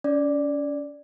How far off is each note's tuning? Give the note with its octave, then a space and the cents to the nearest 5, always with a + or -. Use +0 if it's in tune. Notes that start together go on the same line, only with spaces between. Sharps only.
C#4 +35 D5 +0